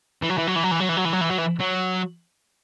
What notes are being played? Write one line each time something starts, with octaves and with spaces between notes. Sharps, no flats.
E3
F#3
E3
F#3
E3
F#3
E3
F#3
E3
F#3
E3
F#3
E3
F#3
E3
F#3